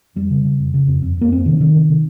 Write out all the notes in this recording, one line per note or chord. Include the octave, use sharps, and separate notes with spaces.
F2 G3
C#3
C#3
F2
C#3
F2
F2
F2 A#3
F2 C4
C3 D#3
C3 D#3
C3
C3